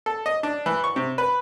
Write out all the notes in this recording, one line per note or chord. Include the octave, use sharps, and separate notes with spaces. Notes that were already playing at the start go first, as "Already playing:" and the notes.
A4
D#5
D4
E3
C#6
C3
B4